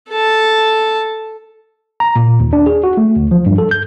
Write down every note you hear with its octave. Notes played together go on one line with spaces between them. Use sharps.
A4 A5
A#5
A#2
D#2
D4
G#4
F#4
A3
D2
F3
G2
A4
G6